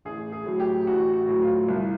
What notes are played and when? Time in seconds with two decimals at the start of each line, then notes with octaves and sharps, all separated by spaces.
0.05 A1 G#4
0.32 G#4
0.46 A2 F#3
0.60 G4
0.87 A1 F#4
1.14 F#4
1.28 A2 F#3
1.42 F4
1.68 C2